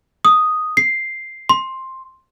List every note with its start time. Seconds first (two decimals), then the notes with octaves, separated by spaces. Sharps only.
0.25 D#6
0.77 C7
1.49 C6